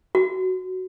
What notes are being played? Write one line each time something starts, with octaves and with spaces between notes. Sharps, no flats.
F#4